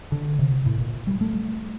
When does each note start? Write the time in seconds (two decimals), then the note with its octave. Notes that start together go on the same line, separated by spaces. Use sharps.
0.12 D3
0.39 C3
0.66 A2
0.81 A#2
1.07 G3
1.21 A3